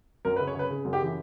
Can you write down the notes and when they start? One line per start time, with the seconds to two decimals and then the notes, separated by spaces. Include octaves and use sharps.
0.25 F#2 A#4
0.36 B4
0.40 C#3
0.47 C#5
0.55 C#3 B4
0.70 C#3
0.85 F#2
0.93 G4
1.01 E3